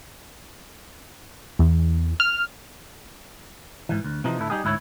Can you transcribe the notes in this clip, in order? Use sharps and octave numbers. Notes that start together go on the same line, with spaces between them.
E2
F6
G#2 E3
D2
C3 E3 F3 D#4
D2 A2 A3 E4
G3 D#4 G4 G#4
D2 G#2 E4 B4 C#5